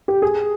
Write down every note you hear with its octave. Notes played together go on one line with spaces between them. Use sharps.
G4
G#4